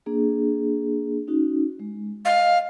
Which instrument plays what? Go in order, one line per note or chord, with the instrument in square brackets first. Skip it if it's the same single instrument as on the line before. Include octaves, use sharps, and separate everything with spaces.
[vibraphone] A#3 D4 G#4
C#4 D#4 F#4
G#3
[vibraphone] D#5 [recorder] F5